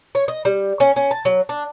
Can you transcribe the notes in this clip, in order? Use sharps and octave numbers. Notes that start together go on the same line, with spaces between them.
C#5
D#5
G3
C#4
C#4
A5
F#3
D4